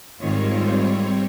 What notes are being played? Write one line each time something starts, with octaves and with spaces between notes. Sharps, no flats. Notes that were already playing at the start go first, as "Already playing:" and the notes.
G#2 D#3 G3 C4 F4 C#5